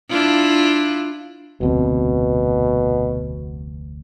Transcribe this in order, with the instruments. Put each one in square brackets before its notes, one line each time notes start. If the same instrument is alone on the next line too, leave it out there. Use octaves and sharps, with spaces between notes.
[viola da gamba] D4 E4 F4
[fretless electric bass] F1 D2 C4 [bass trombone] B2